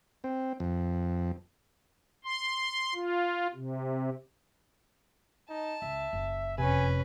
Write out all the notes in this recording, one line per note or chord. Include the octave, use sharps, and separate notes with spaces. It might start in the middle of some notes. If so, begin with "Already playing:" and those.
C4
F2
C6
F4
C3
D#4 A5
C#2 E5
F#1
F2 C3 C#4 B4 G#5